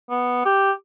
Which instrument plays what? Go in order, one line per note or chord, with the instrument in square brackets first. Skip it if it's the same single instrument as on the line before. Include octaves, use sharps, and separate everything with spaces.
[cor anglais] B3
G4